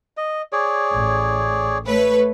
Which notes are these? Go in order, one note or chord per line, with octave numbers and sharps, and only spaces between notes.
D#5
G#4 C#5 D5
A1
A3 B4 C#5